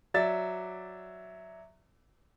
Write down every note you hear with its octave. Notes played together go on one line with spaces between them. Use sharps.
F#3 D5 E5 A6